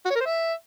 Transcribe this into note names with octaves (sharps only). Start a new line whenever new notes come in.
F#4
C#5
A#4
C5
E5